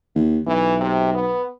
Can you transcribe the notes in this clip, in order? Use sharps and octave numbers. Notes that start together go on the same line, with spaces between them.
D#2
B1 E3
C3
B3